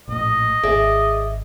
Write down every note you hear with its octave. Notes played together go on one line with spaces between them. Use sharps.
A#1 A2 D#5
G#1 G#4 D5 E5